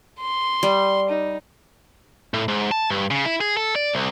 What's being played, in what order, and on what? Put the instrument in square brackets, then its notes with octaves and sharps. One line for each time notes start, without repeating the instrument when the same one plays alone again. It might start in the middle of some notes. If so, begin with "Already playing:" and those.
[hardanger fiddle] C6
[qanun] G3
[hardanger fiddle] D#4
[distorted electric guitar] A2
G#2
A5
G2
C#3
E4
G#4
A4
D5
C2